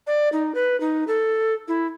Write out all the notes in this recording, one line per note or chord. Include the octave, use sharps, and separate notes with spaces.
D5
D#4
B4
D#4
A4
E4